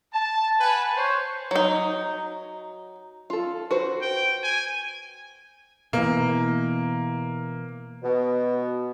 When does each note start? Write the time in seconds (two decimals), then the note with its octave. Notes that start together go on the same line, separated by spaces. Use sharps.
0.13 A5
0.60 B4 F#5 G#5 A5
0.96 C5 C#5
1.51 F#3 D#4
3.30 F4 A4
3.71 F#4 B4 C5
4.02 G5
4.43 G#5
5.93 B2 E3 A#3
8.03 B2